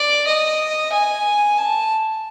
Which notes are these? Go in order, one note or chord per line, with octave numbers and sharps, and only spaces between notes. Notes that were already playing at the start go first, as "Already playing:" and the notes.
Already playing: D5
D#5
G#5
A5